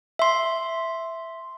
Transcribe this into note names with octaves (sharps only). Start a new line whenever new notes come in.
E5 C6